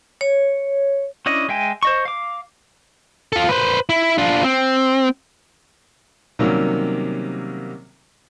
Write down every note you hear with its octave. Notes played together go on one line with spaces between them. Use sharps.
C#5
C#4 D4 E4 D#5
G#3 E5 G5 G#5
C5 D#5 C#6
F5 D6
F4 A4
B4 C5
E4
D4 F4
C4
C3 D#3 F#3 G3 A#3 C#4